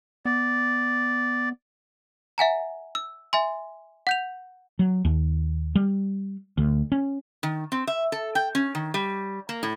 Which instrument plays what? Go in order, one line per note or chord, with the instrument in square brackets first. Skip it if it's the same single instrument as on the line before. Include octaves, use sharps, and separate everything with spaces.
[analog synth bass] B3 [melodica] D5
[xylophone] E5 F#5 G#5 A#5
E6
E5 G#5 C6
F#5 G6 F7
[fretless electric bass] F#3
D#2
G3
D2
C#4
[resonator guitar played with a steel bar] D#3
C4
E5
A4
G5
C#4
D#3
G3
A#3
A2